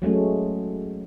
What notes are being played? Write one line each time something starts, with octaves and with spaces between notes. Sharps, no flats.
F#3 G#3 A3 C#4